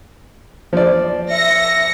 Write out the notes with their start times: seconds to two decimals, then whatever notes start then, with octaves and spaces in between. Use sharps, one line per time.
0.73 F3 D5
1.31 E5 A#6 C#7